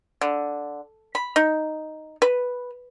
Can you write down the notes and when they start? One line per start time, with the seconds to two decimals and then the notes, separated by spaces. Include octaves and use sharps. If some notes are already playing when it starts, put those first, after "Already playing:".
0.21 D3
1.15 B5
1.36 D#4
2.22 B4